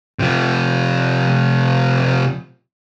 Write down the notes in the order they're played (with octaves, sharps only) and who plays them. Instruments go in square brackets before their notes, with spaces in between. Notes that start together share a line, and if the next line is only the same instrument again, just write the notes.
[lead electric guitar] C3 F3